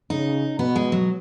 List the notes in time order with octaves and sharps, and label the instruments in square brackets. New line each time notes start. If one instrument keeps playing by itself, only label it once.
[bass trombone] C#3 [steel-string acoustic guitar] D#4
[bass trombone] B2 [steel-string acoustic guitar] B3
[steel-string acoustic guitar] G#3
F#3